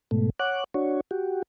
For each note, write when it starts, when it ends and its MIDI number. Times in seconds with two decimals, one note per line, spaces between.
0.11 0.30 44
0.11 0.30 47
0.11 0.30 57
0.40 0.64 73
0.40 0.64 78
0.40 0.64 86
0.40 0.64 90
0.74 1.01 62
0.74 1.01 66
0.74 1.01 73
1.11 1.42 66
1.11 1.42 67